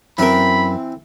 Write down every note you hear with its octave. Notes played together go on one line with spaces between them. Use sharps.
F#2 E3 C4 A#4 B5